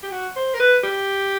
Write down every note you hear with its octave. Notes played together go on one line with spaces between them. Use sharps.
G4
F#4
C5
A#4
B4
G4